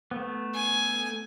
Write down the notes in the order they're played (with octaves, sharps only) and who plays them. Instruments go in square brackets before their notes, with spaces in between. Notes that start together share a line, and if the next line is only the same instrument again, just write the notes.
[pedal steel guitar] A3 B3
[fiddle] G#5